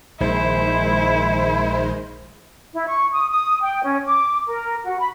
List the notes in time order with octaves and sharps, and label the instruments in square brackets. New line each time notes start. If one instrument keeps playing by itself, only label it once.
[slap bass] A#1 [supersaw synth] D#3 G#3 C5 [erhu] E4
[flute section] E4
C#6
D#6
D#6
G5
C#4
D6
A#4
F#4
B5